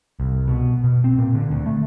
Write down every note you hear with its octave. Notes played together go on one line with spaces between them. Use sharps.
C2
B2
B2
C4
A#2
D3
D2
A3